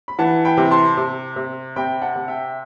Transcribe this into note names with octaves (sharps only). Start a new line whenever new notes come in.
B5
E3 F#5 A5
G5 B5
C3
A5 C6
C3
C3
C3 G5 B5
F#5 A5
C3
E5 G5